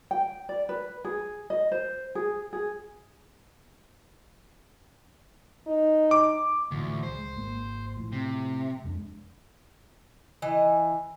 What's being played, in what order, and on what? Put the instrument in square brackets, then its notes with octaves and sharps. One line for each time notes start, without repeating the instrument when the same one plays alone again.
[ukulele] G5
D5
B4
G#4
D#5
C5
G#4
G#4
[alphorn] D#4
[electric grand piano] D6
[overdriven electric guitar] D2 [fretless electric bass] A2 E3 F3
[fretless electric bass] C#2 G#3 [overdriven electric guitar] C5
[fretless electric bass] G#1 A#3
A2 F3
[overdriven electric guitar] C3
[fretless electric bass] F2 G#3 D4
[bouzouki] E3 D#5